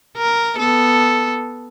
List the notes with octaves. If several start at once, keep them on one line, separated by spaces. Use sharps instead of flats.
A#4
B3 A4